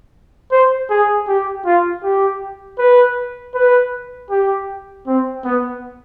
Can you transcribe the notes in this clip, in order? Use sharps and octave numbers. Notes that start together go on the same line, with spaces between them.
C5
G#4
G4
F4
G4
B4
B4
G4
C4
B3